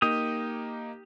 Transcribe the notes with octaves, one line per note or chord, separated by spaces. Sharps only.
A#3 D#4 G4 D#6